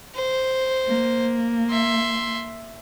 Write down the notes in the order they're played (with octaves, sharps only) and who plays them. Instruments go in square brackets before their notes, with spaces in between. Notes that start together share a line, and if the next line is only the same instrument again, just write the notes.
[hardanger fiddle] C5
[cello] A#3
[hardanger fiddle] E5 C6